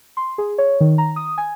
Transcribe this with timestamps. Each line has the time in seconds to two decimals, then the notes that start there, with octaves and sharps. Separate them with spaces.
0.17 C6
0.38 G#4
0.58 C#5
0.81 D#3
0.98 A#5
1.16 D#6
1.38 G#5